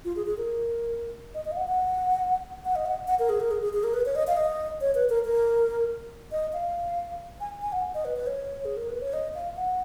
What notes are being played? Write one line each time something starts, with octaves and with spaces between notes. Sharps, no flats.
F4
G#4
G#4
A#4
D#5
D#5
F5
F#5
F#5
F#5
D#5
F#5
F#5
A#4
G#4
A#4
G#4
G#4
G#4
A#4
B4
C#5
D#5
F5
D#5
C#5
B4
A#4
A#4
D#5
F5
G#5
G#5
F#5
D#5
B4
B4
C#5
G#4
A#4
B4
C#5
D#5
F5
F#5